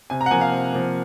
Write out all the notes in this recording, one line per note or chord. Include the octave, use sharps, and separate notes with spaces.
C3 G#5
A#5
F#5
F3 A#3 G#5
F5
C3
F3 A#3